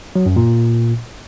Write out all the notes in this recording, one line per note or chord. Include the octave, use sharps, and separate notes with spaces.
F#3
F#2
A#2